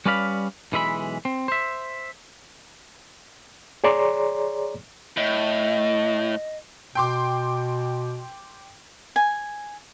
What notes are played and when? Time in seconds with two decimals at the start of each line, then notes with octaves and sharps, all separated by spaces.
0.06 G3 C#4 B4 D5 F5 B5
0.72 B1 E3 G#3 E5 B5
1.25 C4
1.48 C5 E5
3.84 G#4 C#5 D5 A#5 C6 D6
5.17 A2 D#5
6.95 B2 G5 C6 D6
9.16 G#5